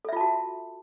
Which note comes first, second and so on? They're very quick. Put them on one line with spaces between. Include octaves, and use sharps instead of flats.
A4 E5 F4 A5 F#4